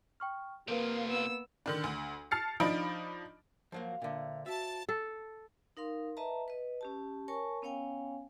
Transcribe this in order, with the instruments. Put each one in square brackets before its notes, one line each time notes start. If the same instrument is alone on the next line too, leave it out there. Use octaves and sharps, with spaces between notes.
[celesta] G5 C#6 F6
[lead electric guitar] C3 F4 [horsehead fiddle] A#3 [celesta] A#4 B4
[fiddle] B3 E6
[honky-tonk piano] D3 D#3 D4
D2
A5 F6 A6 C7 C#7
F3 D4 D#4 B5 D7
[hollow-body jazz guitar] F3 F#3 A#3 [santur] C5 F5 F#5
[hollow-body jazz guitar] A#2 D3 [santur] A#4 G5 [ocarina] E5
[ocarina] F#4 [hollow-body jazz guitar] E5 [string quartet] A5 A6
[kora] A4
[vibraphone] D#4 A#4 F5 C6
B4 D#5 E5 A5 A#5
B4 D#5
C#4 G4 A5
A#4 C#5 G#5 A5 C#6
B3 C#4 C#5 F5 G5 G#5